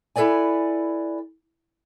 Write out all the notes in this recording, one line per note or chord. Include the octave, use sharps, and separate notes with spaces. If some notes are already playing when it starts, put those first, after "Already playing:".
E4 A4 B4 D5 G#5